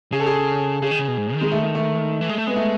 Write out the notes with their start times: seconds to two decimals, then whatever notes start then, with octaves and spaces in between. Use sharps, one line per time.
0.12 C#3 G#4
0.20 A4
0.26 G#4
0.82 C#3 G#4
0.91 D#3
0.99 C#3
1.08 B2
1.17 G#2
1.34 D#3
1.41 G#3
1.52 A3
1.63 A3
1.75 A3
2.21 E3
2.29 G#3
2.38 A3
2.47 G#3 B3
2.56 A3